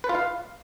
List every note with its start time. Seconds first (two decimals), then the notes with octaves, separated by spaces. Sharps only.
0.04 B4
0.09 F4
0.15 F5